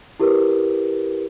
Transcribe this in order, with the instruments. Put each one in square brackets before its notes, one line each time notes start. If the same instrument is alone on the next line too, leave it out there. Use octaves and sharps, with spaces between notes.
[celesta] E4 G4 A#4 B4